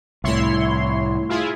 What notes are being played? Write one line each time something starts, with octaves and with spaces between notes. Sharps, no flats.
C2 A2 E4 C#5 C6
E4 F4 G#4